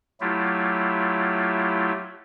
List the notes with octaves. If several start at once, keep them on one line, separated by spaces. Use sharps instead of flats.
F#3 A3 E4 F4 G4